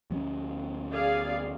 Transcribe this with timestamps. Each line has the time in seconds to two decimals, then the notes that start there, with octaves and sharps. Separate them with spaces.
0.11 D2 F3 C#4
0.92 G#4 D5 F5